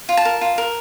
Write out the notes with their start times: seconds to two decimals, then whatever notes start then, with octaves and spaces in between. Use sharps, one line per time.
0.09 F4
0.17 A5
0.25 A#4
0.41 F4
0.58 A#4